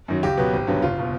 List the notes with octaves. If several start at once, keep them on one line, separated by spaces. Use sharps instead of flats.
F#2 D#3 F#3
C#2 G4
B2 F#3 B3
G#1
G2 D3 F#3 B3
F#1 F4
B2